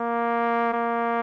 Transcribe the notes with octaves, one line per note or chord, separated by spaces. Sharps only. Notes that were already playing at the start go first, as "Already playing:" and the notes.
Already playing: A#3
A#3